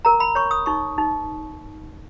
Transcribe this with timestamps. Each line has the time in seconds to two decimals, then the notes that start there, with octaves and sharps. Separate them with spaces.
0.05 A#4 A#5
0.20 B5
0.35 C#5 C#6
0.51 D#6
0.66 D#4 C#6
0.98 D#4